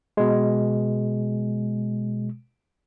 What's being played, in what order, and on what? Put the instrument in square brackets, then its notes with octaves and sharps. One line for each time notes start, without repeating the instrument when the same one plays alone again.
[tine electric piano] B2 G#3